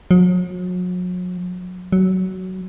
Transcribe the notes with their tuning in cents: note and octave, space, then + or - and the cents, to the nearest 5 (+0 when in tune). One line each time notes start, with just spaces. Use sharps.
F#3 -40
F#3 +15